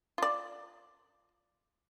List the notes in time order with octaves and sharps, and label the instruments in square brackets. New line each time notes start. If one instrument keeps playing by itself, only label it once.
[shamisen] F4 D5